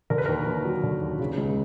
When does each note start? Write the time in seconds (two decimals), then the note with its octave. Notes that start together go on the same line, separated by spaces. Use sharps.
0.10 D3 A#4
0.18 B4
0.26 D#2 A#4
0.46 D#2
0.65 F#3
0.83 D3
1.01 D#2
1.19 C#3
1.38 C#2